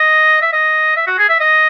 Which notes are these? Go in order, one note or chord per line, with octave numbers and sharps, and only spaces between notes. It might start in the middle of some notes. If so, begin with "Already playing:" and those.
Already playing: D#5
E5
D#5
E5
F#4
G#4
E5
D#5